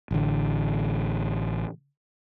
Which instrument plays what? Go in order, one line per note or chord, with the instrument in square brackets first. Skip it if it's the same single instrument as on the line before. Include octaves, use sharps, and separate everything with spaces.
[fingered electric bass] A1 D3